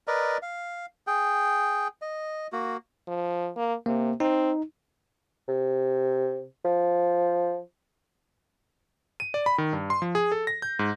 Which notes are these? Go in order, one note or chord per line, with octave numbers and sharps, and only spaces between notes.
A#4 B4 D5 D#5
F5
G#4 G5
D#5
A#3 F#4
F3
A#3
C3 A#3
C4 D#4
C3
F3
D#7
D5
B5
D#3
G2
C6
F3
G#4
A4
A#6
G6
G#2